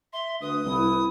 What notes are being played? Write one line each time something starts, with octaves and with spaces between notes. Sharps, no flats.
E5 C6
D2 B4 D#6
C2 E4